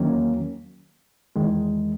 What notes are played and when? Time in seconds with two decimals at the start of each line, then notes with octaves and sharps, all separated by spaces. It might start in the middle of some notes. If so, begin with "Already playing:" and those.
Already playing: E2 D#3 F#3 A#3 C#4
1.36 E2 D#3 G#3